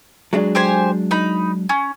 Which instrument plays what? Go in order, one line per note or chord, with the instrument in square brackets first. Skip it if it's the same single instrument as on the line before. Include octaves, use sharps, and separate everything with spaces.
[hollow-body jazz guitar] F#3 G#3 D4
[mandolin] G4 C5 G#5
D#4 B5
C#4